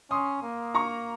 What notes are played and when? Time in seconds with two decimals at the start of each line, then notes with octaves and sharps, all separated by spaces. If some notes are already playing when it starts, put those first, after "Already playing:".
0.10 C#4 C6 D#6
0.42 A#3
0.74 A#5 C#6